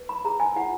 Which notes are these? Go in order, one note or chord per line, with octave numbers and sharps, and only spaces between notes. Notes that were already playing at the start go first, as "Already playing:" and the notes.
Already playing: B4
B5
G#4 A#5
G#5
F4 F#5